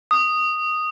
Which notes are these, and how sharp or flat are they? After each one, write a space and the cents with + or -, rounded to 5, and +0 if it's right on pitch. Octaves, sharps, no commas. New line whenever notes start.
D#6 -5